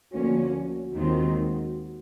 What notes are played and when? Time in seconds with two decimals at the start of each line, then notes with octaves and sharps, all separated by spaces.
0.12 D2 D3 F3 A#3 C#4 F#4
0.53 F#4
0.95 D#2 D#3 G#3 C4 F4 F#4